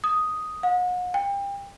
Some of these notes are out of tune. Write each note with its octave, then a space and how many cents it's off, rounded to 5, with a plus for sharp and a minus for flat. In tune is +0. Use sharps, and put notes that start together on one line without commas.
D#6 +5
F#5 -40
G5 +30